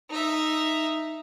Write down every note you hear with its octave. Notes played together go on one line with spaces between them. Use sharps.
D#4 E5